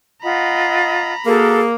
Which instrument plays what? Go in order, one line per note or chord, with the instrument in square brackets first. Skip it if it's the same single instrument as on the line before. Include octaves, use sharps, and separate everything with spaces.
[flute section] F4 D#5 F#5 [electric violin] A#5 B5
[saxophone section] A#3 [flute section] F#4 A4 [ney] G#4